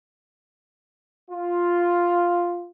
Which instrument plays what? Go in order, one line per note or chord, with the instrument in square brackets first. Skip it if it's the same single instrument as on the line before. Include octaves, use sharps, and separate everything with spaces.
[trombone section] F4